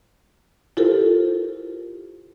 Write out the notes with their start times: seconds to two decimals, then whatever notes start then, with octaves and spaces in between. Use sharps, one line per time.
0.77 E4 F4 G4 A4 A#4 C5